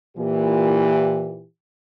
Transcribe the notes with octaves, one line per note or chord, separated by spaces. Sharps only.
A#2 E3 G4